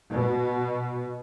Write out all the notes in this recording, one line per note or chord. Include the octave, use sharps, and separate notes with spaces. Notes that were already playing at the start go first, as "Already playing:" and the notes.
B2